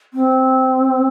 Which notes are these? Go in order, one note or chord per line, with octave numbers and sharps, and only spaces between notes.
C4